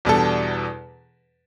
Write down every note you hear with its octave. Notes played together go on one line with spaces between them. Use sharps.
E2 B2 G3 D4 A4